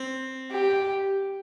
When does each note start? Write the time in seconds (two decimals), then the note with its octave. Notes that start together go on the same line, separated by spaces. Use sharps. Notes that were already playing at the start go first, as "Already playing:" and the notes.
Already playing: C4
0.51 G4